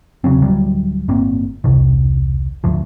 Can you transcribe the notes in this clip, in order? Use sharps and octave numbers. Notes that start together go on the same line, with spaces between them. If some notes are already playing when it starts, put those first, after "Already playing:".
E1 C#3 F#3 C4
D1 D2 F#3 G3
G1 A2 A#3 C4
E1 C2 C3 D#3
D2 G#2 F3